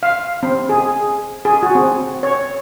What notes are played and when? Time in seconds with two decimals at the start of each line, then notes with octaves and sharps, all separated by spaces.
0.03 F5
0.43 C4
0.69 G#4
1.45 G#4
1.63 F#4
1.75 C4
2.23 C#5